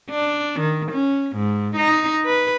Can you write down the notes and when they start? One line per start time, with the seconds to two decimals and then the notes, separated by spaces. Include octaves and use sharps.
0.10 D4
0.60 D#3
0.92 C#4
1.36 G#2
1.76 D#4
2.26 B4